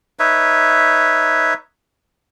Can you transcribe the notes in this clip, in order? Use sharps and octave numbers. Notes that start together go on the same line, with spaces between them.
D#4 B4 C#5 E5